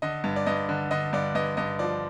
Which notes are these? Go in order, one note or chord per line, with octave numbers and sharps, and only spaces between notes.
D3 D#5
G2
D5
G2 D#5
D3
D3 D#5
G2 D5
G2 D#5
G2 D#5
F3 D5